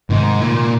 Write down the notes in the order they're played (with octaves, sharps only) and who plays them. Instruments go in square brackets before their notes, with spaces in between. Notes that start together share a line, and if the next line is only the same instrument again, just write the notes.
[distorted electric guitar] G#2 [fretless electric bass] C3 D#3
[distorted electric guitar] A#2